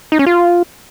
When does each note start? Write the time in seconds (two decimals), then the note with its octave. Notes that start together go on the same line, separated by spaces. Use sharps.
0.12 D#4
0.19 C#4
0.26 F4